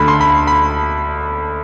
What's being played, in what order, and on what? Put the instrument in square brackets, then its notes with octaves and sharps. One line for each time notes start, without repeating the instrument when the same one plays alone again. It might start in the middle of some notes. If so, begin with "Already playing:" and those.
Already playing: [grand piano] D2 D3 B5
C6
B5
B5